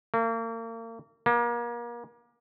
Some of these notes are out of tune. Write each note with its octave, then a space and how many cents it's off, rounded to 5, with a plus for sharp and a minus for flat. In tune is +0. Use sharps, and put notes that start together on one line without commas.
A#3 -35
A#3 +35